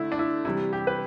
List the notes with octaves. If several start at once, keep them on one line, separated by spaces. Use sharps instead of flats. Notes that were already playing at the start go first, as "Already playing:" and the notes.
Already playing: D3 A3 E4
D4
E4
C3 E3 G3 E4
G4
B4